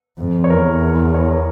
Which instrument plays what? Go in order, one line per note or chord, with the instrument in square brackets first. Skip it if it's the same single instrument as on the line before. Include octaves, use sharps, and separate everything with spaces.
[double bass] F2
[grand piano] C#5
[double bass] E2 [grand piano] A#4
[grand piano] C#5
A#4